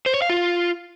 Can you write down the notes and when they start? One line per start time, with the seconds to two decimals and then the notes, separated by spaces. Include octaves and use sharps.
0.06 C5
0.14 C#5
0.22 F5
0.30 F4